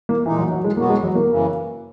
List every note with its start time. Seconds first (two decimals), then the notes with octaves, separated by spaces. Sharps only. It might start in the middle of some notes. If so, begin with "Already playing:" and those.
0.09 A#3
0.26 A#2 E3 G#3 D#4
0.39 F#3
0.52 F#3
0.64 G#3
0.77 B2 F#3 A#3 B3 F#4
0.90 G#3
1.03 F#3
1.15 A#3
1.28 F#2 C#3 E3